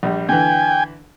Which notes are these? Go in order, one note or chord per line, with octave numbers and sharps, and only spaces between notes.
A#1 G3
D3 E3 G5 G#5